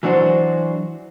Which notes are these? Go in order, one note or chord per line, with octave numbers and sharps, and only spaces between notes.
E3 F#3 D4 F#4 C5